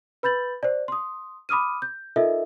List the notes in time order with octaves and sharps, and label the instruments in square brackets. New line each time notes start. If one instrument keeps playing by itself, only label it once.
[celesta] B4 B5 G6 A6 F#7
C5 D5
C6 D#6
B5 D6 D#6 F6 D#7
G6
D#4 F4 A4 A#4 D#5 E5